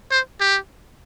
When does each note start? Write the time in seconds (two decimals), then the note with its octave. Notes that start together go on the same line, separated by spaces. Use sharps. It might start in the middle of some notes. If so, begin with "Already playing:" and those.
0.11 C5
0.40 G4